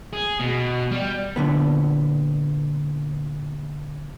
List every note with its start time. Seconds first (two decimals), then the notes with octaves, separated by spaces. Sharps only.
0.13 G#4
0.39 B2
0.91 G3
1.36 A#2 D3 B3